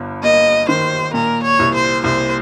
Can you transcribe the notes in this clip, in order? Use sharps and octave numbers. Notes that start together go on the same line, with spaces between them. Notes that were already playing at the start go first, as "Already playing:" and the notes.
Already playing: G1 G2
A#3 D#5
D#3 C5
A#2 A#4
C#5
C2
C5
C2 C5